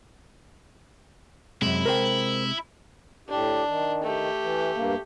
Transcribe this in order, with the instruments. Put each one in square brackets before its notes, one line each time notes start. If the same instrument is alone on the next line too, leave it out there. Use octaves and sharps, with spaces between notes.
[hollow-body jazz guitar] C#2 F#2 [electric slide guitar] C3 G#3 [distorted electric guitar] E4
[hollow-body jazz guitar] A#4 C5 G5
[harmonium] A2 G4 [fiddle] D4
[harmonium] D#3
[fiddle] A3 G4
[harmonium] E3
G2 A#3